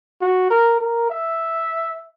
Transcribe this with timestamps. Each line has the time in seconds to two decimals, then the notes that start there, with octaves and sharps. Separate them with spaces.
0.22 F#4
0.51 A#4
0.81 A#4
1.10 E5